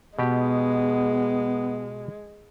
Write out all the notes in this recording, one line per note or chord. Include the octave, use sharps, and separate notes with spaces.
B2 G#3 B3 G4